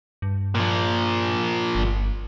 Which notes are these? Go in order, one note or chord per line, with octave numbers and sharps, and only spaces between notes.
G2
A#2 F3
G1